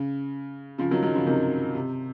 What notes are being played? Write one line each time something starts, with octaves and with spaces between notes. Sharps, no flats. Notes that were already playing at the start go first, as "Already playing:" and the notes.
Already playing: C#3
C#3 F3
D#3 F#3
D#3 F#3
C#3 F3
C3 D#3
C3